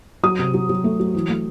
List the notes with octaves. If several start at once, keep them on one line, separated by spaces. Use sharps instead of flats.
F#3 D#6
C3
F#3
F#3
A3
F#3
E3
A3